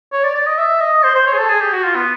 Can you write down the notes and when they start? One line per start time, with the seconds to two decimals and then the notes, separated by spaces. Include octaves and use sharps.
0.13 C#5
0.24 D5
0.35 D5
0.47 D#5
0.58 E5
0.81 D#5
1.03 C5
1.15 C5
1.27 C#5
1.33 G#4
1.39 A4
1.49 G#4
1.61 G4
1.73 F#4
1.84 F4
1.96 B3